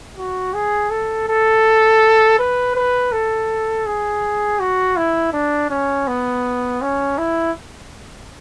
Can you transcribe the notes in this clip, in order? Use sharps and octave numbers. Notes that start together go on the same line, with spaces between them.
F#4
G#4
A4
A4
B4
B4
A4
G#4
F#4
E4
D4
C#4
B3
C#4
E4